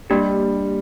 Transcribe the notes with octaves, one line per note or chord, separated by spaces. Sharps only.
G3 A#3 D4 G4